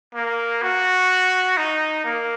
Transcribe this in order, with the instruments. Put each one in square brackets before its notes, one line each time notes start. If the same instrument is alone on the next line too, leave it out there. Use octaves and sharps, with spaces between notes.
[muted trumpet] A#3
F#4
D#4
A#3